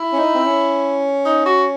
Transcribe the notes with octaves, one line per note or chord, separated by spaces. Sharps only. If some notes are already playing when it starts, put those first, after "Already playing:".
Already playing: E4
C#4
D#4
C4
C#4
D#4
F#4